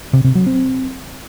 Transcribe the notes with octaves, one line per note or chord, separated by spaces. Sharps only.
C3
C3
F#3
C4